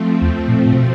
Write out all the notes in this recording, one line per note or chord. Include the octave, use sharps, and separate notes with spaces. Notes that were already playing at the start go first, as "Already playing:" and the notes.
Already playing: F3 A3 C4
E2
A#2
A#2
B2